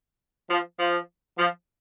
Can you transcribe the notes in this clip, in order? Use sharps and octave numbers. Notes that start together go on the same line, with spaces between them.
F3
F3
F3